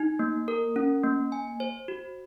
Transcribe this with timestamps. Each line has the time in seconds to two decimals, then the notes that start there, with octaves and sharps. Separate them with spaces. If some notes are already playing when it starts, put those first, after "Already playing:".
Already playing: D#4
0.19 A#3
0.48 A#4
0.76 C#4
1.04 A#3
1.32 G#5
1.60 C5
1.88 F#4